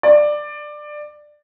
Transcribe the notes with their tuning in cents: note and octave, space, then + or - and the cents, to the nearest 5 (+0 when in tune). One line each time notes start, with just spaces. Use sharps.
D5 +15